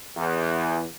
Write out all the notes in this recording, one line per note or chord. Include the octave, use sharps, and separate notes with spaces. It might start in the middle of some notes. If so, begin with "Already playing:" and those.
E2